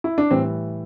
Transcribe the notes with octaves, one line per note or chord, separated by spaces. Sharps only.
E4
D4
A2 E3 G3 C4